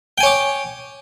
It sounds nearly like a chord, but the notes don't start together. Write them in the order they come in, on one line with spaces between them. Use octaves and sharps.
G5 G#5 C#5 D6